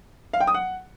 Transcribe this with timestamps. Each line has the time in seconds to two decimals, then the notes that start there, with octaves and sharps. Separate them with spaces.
0.33 F5
0.40 G5
0.47 D#6
0.54 F#5